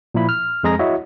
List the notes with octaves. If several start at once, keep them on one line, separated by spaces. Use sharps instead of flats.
A#2 F3 E4 B5
F6
F2 G#3 G#4 A#5 A#6
E4 F#4 C#5 D#5 E5